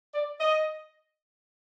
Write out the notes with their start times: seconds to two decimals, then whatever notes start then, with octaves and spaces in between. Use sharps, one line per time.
0.12 D5
0.39 D#5